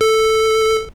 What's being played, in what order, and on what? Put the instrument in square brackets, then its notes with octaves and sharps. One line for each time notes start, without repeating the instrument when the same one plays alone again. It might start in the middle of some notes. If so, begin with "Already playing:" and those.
[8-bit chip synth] A4